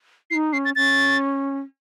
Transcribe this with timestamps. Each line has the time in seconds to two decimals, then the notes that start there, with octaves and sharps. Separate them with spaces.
0.30 E4 C7
0.35 D#4
0.53 C#4 C7
0.65 A6
0.76 C#4 A6